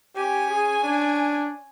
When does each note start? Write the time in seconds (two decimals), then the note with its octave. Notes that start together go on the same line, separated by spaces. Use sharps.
0.16 C#4 G4 G#5
0.50 G#4
0.84 D4